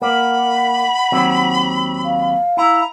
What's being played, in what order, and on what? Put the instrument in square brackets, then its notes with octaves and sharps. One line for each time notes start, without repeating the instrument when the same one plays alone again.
[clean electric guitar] A#3 [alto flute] F#5 [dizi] B5
[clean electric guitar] D#2 F#3 C4
[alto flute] F5
[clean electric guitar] E4 [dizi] A#5